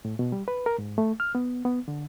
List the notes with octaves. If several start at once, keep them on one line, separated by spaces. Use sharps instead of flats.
A2
B2
G3
B4
A#4
G#2
A3
F6
B3
B3
D3